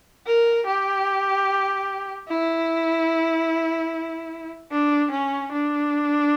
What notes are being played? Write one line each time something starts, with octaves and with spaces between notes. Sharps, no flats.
A#4
G4
E4
D4
C#4
D4